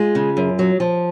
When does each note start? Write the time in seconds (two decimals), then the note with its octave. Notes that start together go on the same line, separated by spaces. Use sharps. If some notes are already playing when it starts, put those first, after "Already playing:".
Already playing: G#3 F4
0.15 C#3
0.37 F#2
0.59 F#3
0.80 F3